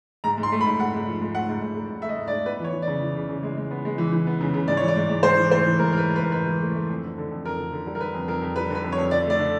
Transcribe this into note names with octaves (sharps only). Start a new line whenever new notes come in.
G#2 A#5
G#2
C6
A3
B5
G#2
G#2 F#5
G#2
F3
G#2
A3 F#5
G#2
G#2
A3
G#2
A3 E5
D#5
G#2
D5
A3
B3 B4
E3 C#5
E3
D5
C#3
E3
C#3
C#3
G#3
G#3
B3
G#3
E3
E3
B3
C#3
C#3
G#2 D5
E3 C#5
D5
G#2
G#2
G#2 C5
E3
A3 C5
E3
G#2 A#4
G#2 A#4 B4
A3
B4
G#2 A#4
G#2 B4
E3
A3
A3
F2
D3
D3
F2
F2 A#4
D3
D3
G3
A#4
D3 B4
F2
F2 A#4
F2
G3 B4
D3 B4
F2
C#5
F2
D3 D5
A3 D5
D3